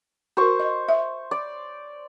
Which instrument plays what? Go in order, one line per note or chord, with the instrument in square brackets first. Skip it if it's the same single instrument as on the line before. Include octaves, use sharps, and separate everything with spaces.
[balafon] F#4 A#4 [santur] C5 C#6
[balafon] D#5
E5
[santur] D5